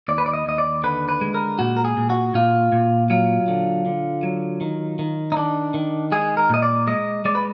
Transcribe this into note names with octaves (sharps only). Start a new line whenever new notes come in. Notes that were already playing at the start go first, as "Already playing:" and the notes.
D#2 D5
B4
D5
D#5
D#2 D#5
D5
D3 B4
B4
G#3
A#4
A#2 F#4
A#4
G#4
A#2
F#4
A#2 F4
A#2
F#3 F4
D3
D3
F#3
D#3
D#3
D#4
D#3 D4
D#3
G#3 G#4
A#4
A#2 D#5
D5
G#3 D#5
G#3 D5
B4